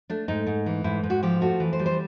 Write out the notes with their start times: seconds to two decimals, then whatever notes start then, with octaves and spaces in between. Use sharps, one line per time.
0.10 A3 D4
0.28 G#2 D#4
0.47 G#2
0.66 E3
0.84 G#2 E4
1.03 G#2
1.10 F#4
1.23 F3 G4
1.41 A3 F#4
1.60 E3
1.73 C5
1.79 G3
1.86 C5